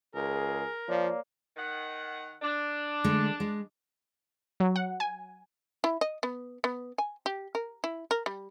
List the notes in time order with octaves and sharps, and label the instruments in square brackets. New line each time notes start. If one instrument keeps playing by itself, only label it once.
[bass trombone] C#2 [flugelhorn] G#4 [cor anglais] A#4
[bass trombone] F3 [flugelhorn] A#3 [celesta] C#5 D5
[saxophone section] D#3 F#5
D4
[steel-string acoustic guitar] D3 G#3 A3
G#3
[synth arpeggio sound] F#3
F#5
G#5
[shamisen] E4
D#5
B3
B3
G#5
G4
A#4
E4
A#4
G3